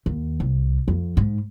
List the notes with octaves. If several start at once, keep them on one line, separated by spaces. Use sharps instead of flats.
D#2
C2
F2
G#2